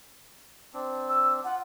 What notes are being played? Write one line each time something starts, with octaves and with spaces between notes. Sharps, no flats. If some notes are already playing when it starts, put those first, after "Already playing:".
C4 D4
E6
F4 F#5